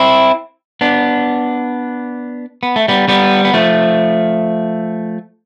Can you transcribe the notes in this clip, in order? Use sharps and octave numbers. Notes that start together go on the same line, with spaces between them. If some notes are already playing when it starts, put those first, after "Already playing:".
Already playing: C4 E4
B3 D4
B3
A3
G3 B3
G3 B3
B3
F3 A3